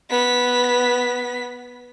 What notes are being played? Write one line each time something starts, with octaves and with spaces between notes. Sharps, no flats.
B3 B6